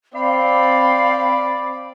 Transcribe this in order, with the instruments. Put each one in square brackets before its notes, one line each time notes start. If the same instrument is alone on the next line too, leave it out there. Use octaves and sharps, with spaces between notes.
[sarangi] C4 [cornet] D5 [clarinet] F5 [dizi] B5